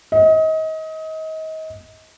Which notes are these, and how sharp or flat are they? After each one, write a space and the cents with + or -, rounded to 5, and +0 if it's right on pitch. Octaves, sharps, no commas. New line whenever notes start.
D#5 +30